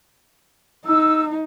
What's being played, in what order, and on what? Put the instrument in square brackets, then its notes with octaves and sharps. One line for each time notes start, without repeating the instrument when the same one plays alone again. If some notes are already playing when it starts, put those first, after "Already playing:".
[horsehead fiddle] D#4 [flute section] E6